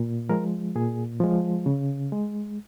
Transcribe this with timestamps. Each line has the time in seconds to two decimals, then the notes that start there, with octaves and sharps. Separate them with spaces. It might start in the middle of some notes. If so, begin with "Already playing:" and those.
Already playing: A#2
0.29 F3 G#3 A#4
0.75 A#2 G#4
1.20 F3 G#3
1.66 C#3
2.12 G#3